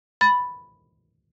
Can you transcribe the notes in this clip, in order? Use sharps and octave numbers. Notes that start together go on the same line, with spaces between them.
B5 A6